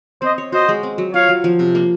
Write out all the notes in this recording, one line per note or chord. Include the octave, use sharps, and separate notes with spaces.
C4 C5 D#5
C#5
F#4 C5 D#5
G#3
C4
F#3
F4 C#5 F5
F#3
F3
C3
A#3